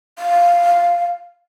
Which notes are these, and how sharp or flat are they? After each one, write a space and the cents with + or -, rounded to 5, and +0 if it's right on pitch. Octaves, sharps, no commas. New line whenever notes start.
F5 -5